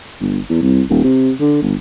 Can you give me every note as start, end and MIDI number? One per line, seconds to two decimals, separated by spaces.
0.21 0.39 31
0.49 0.60 40
0.62 0.82 36
0.89 1.02 27
1.04 1.32 48
1.40 1.58 50
1.62 1.75 31